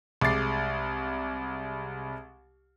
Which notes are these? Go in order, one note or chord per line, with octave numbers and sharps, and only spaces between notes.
C2 G#3 D6 A6 C7